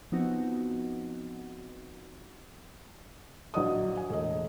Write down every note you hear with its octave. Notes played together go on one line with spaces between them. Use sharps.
F3 B3 C4 D#4 F#4
A#1 F#3 F#4 D5 D#5 D#6
G#5
E1 A3 D#5